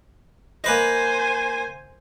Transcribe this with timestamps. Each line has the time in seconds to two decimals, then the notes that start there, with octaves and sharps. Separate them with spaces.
0.64 A#3 B4 C5 D#5 G#5